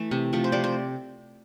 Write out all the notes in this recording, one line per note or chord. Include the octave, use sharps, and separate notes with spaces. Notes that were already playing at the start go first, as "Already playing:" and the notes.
Already playing: E3 A3
C3
F3 A3
C5
C3 D5
C5